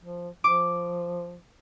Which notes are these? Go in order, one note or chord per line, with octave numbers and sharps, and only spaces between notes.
F3
F3 D6